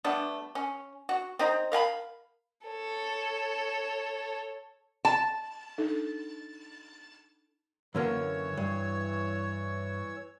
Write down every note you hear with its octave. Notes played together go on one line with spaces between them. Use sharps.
G3 A3 B3 D4
C#4
F#4
C4 D#4 A#5
A#4 F5 G#5 B5
A4 C#5
A5
D4 D#4 A4
F#2 D3 E3 A#3 C#5 E6
G2